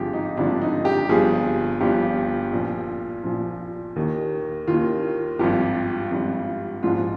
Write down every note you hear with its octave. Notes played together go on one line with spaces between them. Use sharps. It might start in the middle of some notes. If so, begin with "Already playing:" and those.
Already playing: G#1 G2 D3 F3 G4 G#4
D#4
G#1 G2 D3 F3 D4
D#4
G4
G1 G2 F3 G#4
G1 G2 F3 G4
A#1 A#2 F3
A#1 A#2 F3
D#2 D#3
D#2 D#3 F4
G#1 G2 F3 G4
G#1 G2 F3
A#1 G#2 F3 F4